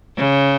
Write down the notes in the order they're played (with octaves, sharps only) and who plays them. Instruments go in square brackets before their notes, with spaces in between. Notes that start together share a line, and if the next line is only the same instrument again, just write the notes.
[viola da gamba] C#3